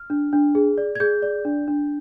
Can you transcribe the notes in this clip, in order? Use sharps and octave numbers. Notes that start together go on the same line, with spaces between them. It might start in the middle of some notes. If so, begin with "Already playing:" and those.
Already playing: F6
D4
D4
G#4
D5
G#6
G#4 G6
D5
D4
D4